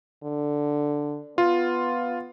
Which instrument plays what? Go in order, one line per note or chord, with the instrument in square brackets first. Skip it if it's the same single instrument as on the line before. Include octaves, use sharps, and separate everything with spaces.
[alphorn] D3
[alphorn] B3 [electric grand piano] F4